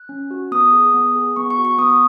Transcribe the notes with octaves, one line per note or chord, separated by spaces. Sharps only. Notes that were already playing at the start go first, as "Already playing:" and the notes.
Already playing: F#6
C#4
F#4
B3 D#6
G#4
B3
G#4
B3 C#6
C#6
F#4
C#6
B3 D#6
D#6